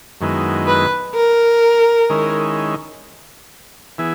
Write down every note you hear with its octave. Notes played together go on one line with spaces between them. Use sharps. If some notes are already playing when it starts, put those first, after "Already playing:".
F#2 D#3 G#3 B3 E4
B4
A#4
D#3 G#3 C#4 E4
E3 B3 E4 G#4